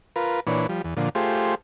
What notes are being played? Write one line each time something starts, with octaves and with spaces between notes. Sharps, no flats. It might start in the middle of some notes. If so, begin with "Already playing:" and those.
F4 A#4 B4
A#2 E3 D4 B4 C#5
F3 G3
E2
A#2 D3 F3
A3 F4 G4 G#4 C5